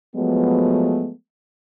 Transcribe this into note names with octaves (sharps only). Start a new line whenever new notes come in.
F3 F#3 G#3 A3 B3